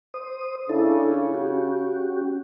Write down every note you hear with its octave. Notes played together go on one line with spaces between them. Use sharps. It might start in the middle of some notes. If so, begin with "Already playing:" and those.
C5 D#6
C#3 D4 E4 A4
C#4 F#4 G4